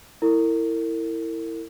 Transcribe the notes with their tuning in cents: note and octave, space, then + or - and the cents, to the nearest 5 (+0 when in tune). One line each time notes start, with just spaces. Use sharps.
E4 +0 A#4 -40